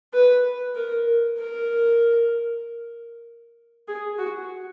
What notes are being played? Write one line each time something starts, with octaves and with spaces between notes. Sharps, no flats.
B4
A#4
A#4
G#4
F#4